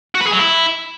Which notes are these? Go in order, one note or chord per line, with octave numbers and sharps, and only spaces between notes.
F#4
B4
G#4
F#3
E4